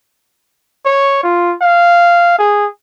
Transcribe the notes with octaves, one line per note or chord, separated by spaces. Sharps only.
C#5
F4
F5
G#4